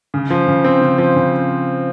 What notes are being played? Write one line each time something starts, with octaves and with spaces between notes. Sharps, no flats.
C#3
F3
C#3
C4
C#3
F3
C#3